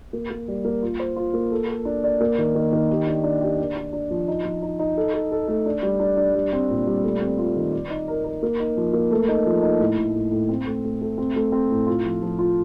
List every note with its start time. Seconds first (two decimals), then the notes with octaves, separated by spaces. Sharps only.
0.13 A#3
0.30 A#3
0.48 G3
0.65 A#3
0.82 F4
1.00 C5
1.16 F4
1.34 A#3
1.52 A4
1.68 A4
1.85 D4
2.04 D5
2.20 A#3
2.38 D#3
2.55 D#3
2.73 D#3
2.90 G4
3.06 D4
3.24 D4
3.41 G4
3.59 D4
3.76 D4
3.93 D4
4.11 F3
4.28 D#4
4.45 F3
4.62 D#4
4.79 D#4
4.97 A4
5.14 A4
5.32 A4
5.48 A3
5.66 D4
5.83 G3
6.00 D4
6.17 D4
6.34 G3
6.53 C4
6.70 A#2
6.87 G3
7.03 A3
7.21 C4
7.38 F4
7.56 D#3
7.72 D5
7.90 D#4
8.08 A#4
8.24 A#4
8.43 A#3
8.60 D#4
8.77 F3
8.93 A#3
9.11 A3
9.28 D#4
9.46 F3
9.62 D#4
9.80 A2
9.97 A2
10.15 A2
10.31 A2
10.49 C4
10.66 A3
10.84 A3
11.01 A3
11.18 C4
11.36 A3
11.52 C4
11.71 A2
11.87 F4
12.05 F3
12.22 F3
12.39 F4